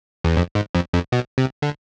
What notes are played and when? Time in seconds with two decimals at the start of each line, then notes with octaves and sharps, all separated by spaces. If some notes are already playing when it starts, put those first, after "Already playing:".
0.24 E2
0.37 F2
0.55 G#2
0.75 F2
0.94 F2
1.12 B2
1.38 C3
1.62 D3